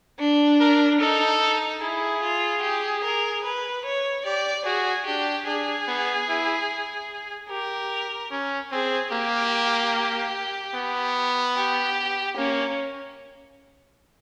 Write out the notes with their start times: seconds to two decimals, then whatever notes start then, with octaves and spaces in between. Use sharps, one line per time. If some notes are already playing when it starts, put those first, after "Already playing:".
0.20 D4
0.61 A#4
1.01 D#4 A4
1.41 D#4
1.82 E4 G#4
2.22 F4
2.63 G4
3.04 A#4
3.44 B4
3.85 C#5
4.25 G4 D5
4.66 F#4 G#4
5.07 D4 G4
5.47 D4 G#4
5.88 B3
6.29 E4
7.50 G4 A#4
8.31 C#4
8.72 C4 G#4
9.12 A#3 G4
10.75 B3
11.56 G4
12.37 A#3 C#4